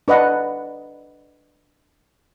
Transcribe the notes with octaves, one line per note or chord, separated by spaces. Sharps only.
D4 B4 D#5 F#5